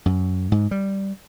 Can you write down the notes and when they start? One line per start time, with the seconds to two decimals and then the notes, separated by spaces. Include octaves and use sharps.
0.06 F#2
0.52 G#2
0.71 G3